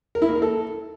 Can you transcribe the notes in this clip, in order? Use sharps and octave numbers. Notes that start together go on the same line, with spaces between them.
A#4
E4
A#3
A#4
A4